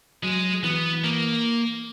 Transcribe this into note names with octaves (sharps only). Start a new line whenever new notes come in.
F#3 G#3
E3 B3
A#3